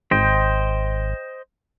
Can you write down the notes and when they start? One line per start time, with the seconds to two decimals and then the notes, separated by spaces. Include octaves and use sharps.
0.11 G#1 C5 D#5 G5